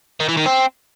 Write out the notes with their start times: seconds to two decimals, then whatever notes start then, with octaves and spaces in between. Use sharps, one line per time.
0.20 D#3
0.29 E3
0.37 D#3
0.46 C4